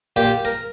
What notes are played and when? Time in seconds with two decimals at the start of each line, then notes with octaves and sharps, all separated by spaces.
0.16 A#2 G4
0.45 A#4